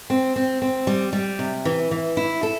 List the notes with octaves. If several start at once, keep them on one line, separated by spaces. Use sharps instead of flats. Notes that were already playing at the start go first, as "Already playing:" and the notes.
C4
C4
C4
G3
G3
C3
E3
E3
E4
A4